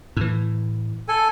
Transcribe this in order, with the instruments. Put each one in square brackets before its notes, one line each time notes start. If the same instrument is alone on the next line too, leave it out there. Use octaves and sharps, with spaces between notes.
[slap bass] A2 E3
[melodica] A4 G#5